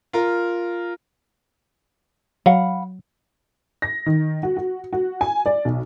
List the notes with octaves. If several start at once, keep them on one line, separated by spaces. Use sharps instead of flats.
F4 A#4
F#3 F5 F#5 B5
A#6
D#3
F#4
F#4
F#4
G#5
D5
B1